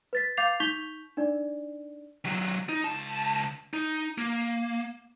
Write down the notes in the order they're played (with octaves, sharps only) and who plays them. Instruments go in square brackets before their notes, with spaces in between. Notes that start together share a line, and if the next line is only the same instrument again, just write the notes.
[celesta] B4 A6 B6
F5 D6 G6 A6 C7 F7
D#4 C#6 G6 B6 F7 G7
D4 D#4 D5
[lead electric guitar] D#3 F#3
D#4
C#2 A5
D#4
A#3